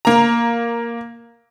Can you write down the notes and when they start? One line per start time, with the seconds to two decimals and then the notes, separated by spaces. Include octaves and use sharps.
0.05 A#3 A#5